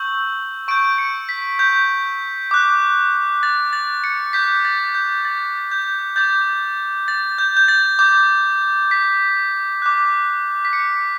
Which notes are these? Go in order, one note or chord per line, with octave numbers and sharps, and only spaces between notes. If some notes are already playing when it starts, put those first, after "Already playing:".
Already playing: C#6 E6 G6 F#7
C#6 G6 D7
C#7
B6
G6
D6 F#6
A6
A6
C#7
D6 G6 B6
A6
G6
A6
G6
D6 G6 A6
A6
G6
G6
A6
D6 G6
B6
D6 F#6
B6
C#7